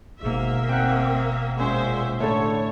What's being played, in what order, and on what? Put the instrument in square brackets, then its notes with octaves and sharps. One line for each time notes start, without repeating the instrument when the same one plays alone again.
[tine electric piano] G1 B2 [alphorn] G#2 [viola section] A#3 E5
[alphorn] C4 [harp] F#5 G5
[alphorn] A#2 [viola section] G#3 C5 E5 [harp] C#4
[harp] A2 A4 [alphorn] D3 [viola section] C#5